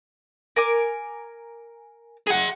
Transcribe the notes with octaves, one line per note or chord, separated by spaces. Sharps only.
A#4 G#5 D6
G#4 F#5